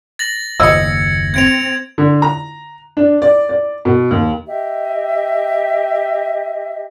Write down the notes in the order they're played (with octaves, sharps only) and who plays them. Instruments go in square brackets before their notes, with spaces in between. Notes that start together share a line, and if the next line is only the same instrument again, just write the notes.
[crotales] A6 A#6 F#7
[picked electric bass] F#1 D#2 [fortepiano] D#5 E6 [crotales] G#6 C#7
[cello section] C4 [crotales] G#6 D7 F7
[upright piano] D3
A#5
D4
D5
D5
B2
D#2
[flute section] G4 D#5 E5